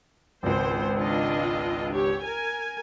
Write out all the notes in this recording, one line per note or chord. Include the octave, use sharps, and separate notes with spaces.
G#1 C#2 C5
D4 F4 D#5
G4 C#5
A#4 G#5